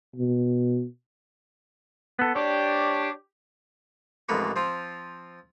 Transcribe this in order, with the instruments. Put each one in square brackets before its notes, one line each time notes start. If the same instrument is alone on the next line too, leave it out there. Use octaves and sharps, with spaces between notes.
[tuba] B2
[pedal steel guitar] B3 A4
[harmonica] D4 C#5 D5 [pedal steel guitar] G4
[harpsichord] A1 F2 G#2 A#3 B4 C#6
F3 C4 F4